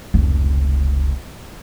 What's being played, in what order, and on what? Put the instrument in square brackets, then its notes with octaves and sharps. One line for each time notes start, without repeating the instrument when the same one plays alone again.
[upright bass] F1 C#2